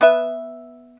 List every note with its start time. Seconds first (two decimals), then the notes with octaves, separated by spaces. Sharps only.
0.01 B3 B4 E5